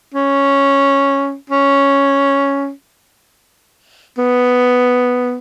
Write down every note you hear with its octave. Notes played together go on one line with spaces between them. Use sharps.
C#4
C#4
B3